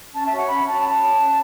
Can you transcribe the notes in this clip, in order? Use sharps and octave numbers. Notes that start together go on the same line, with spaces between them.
C#4 A5
E5
F#4 C#5
F#5
C#4 B5
F#4 C#5 A5
C#4 A5
F#4 C#5
C#4